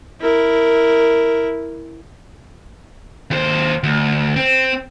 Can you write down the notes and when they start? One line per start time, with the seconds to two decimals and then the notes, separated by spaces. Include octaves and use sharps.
0.21 E4 A#4
3.31 D#2 C5
3.83 D2
4.36 C4